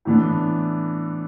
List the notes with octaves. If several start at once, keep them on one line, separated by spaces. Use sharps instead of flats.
A2 E3 B3 D4